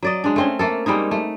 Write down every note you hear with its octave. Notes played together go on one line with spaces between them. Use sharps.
F#3 D5 D#5
G#3 D4
A3 C4 C#4
A3 A#3 A4
G3 G#3 A#3 D#4
A3